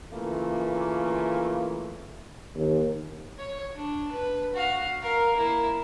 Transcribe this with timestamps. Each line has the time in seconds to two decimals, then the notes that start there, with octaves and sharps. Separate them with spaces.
0.13 C#3 E3 A3 A#3 F4
2.56 D#2
3.38 C#5
3.75 D4
4.12 B4
4.55 F#4 F5
5.02 A#4 F5
5.36 A#3 E4